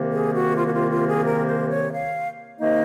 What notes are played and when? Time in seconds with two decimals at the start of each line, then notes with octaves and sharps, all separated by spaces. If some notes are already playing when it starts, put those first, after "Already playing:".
Already playing: C2 C3 D#3 A#3
0.12 G#4
0.34 F#4
0.57 F4
0.67 F#4
0.74 F4
0.90 F4
1.08 G#4
1.24 A#4
1.47 C5
1.70 C#5
1.92 F5
2.60 C3 D#3 A#3 D#4 D#5